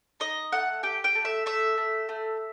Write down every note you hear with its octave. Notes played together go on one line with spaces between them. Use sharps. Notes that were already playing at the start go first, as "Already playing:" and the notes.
D#4 D#5
A3 F#5
G4 G5
G5
A3
E5
A3 E5
A3
A3